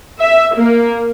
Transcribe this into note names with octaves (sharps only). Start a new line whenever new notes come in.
E5
A#3